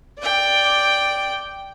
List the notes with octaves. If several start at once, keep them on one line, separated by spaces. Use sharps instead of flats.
D5 G5